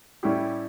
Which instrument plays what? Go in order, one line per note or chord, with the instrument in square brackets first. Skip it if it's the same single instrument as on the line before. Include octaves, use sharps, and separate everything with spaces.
[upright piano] A2 G3 C#4 E4 G4